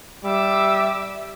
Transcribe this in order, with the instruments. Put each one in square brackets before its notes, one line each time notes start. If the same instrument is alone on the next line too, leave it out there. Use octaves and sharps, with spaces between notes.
[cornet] G3 [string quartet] E5 D6 E6